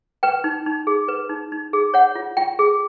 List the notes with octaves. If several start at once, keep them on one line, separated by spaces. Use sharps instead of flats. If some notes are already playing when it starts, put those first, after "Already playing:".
B4 G5
D#4
D#4
G#4
B4
D#4
D#4
G#4
C#5 F#5
F4
F4 G5
G#4